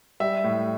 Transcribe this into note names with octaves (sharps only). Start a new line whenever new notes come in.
G3 E5
A2